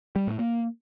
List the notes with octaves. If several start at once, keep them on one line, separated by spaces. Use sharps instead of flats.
G3
A2
A#3